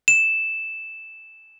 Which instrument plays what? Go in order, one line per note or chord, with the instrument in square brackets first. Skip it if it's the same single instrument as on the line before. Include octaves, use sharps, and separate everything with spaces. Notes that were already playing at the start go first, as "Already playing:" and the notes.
[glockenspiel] E7